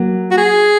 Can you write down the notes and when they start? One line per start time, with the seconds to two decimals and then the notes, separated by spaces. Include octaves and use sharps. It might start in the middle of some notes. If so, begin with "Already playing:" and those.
Already playing: F#3 A#3
0.31 F#4
0.37 G#4